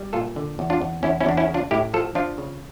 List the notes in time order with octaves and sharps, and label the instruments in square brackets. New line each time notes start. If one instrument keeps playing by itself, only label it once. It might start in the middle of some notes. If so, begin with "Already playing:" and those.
Already playing: [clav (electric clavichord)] G3
A#2 F4 A4
D3
E2
D4 F4
E2
E2 C#4 E4
C#4 E4
E2 D4
C#4 E4
C#3
D4 F4
A2 E4 G4
F3 F4 A4
F3 D4 F4
C#3